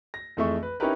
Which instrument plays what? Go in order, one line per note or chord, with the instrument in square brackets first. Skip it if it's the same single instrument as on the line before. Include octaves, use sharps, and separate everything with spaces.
[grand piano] A#6
F2 E3 A3 G#4 E5 C#6
B4
C#4 D#4 E4 G4 A#4 B4